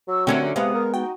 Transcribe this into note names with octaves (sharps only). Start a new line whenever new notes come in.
F#3 C#6 E6
D3 A3 C4 C#4 F#4 G4 A#4 E5
C3 G#3 B3 F5 D6 D#6
A#4
D#4 F#4 G5